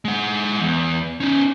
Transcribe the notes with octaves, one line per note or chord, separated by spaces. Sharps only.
G#3 F#5
E2
C#4 D#4